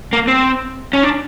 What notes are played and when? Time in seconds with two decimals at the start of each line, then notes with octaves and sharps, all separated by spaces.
0.13 A#3
0.28 C4
0.93 C#4
1.03 D4